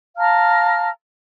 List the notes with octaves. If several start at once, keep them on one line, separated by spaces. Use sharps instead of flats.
F5 A5 A#5 F6